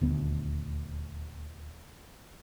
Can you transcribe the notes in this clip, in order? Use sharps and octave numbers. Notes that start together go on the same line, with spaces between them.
D#1 D2 B3